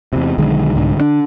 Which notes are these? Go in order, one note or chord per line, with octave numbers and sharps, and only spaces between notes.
E2 C3
B1 D3 D#3 G#3
C2 G#2 D3
D3 D#3 D4